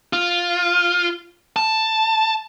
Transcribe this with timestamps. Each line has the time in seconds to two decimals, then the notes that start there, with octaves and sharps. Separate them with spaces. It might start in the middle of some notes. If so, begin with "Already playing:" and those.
0.13 F4
1.56 A5